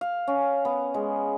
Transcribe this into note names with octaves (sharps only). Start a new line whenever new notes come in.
F5
C#4
B3
G#3